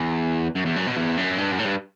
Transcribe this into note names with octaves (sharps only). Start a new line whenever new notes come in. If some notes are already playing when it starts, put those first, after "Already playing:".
Already playing: E2
F#2
E2
F#2
B2
E2
F#2
G2
F#2
A2
G2